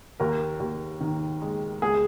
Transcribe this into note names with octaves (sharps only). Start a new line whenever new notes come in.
D#2 A#4
D#2
D#3
G#3
C#2 G#4